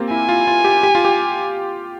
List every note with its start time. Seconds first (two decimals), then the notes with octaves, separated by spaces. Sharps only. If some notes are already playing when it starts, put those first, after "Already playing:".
Already playing: A#3 C4 F4 G4
0.11 E4 G#5
0.29 F4
0.47 F4
0.65 G4
0.83 G4
0.95 F4
1.05 G4